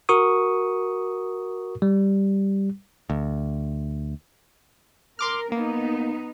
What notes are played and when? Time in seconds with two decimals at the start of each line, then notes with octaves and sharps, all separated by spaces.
0.09 F#4 A#4 C#6 D#6
1.82 G3
3.10 D2
5.19 A#4 C6 D6 F6
5.52 A#3 B3 D#4